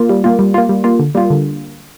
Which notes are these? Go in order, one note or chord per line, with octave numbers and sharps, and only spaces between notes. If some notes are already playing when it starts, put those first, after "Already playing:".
Already playing: A#3 F4
G3
A#3 F4
G3
A#3 F4
G3
A#3 F4
D3
G3 A#3 F4
D3